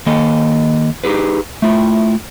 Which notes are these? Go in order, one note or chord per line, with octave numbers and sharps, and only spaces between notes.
D#3 A#3 A4 D#5
D#4 G4 G#4 B4
A3 E4 F4